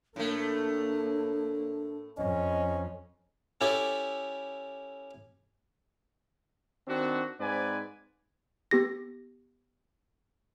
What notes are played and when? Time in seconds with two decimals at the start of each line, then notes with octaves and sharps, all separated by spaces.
0.16 A2 A3 A#3 D4
2.18 F2 C#4 D#5
3.61 C#4 E4 G4 A4 D5
6.88 D#3 C4 D4 F#4
7.40 G#2 C4 B4 D5 G#5
8.71 B3 G4 A#6